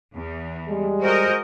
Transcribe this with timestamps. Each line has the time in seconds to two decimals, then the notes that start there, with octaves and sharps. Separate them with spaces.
0.15 E2
0.68 G3 G#3
1.02 F#4 A#4 C5 D#5